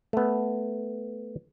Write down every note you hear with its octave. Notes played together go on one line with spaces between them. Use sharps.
A3 B3